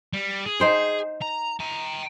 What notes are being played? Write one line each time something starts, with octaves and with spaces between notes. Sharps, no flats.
G3
G#4
D#4 C5 G5
A#5
G5 A#5